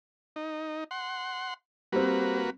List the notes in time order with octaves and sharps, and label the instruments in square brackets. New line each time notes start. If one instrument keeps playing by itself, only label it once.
[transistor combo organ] D#4
F#5 C6
[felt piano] G3 C4 [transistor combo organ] A#3 F#4 B4